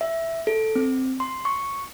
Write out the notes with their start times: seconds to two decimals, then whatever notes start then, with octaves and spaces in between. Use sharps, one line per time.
0.01 E5
0.47 A4
0.76 C4
1.20 C6
1.45 C#6